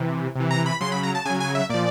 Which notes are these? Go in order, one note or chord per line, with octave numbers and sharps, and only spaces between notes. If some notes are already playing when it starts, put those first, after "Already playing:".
Already playing: C3 E3
C3 E3
A#5
B5
C#3 F#3 C6
B5
A#5
A5
C#3 F#3 G#5
G#5
E5
A#2 F3 D5